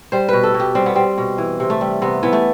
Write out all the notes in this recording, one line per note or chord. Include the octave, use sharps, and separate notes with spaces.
G3 C5
B2 B4
A4
B2
G4
G3 C4
B3
G3 C4
B2
E3
C3
A3
G3
C3 B3
E3 B3
A3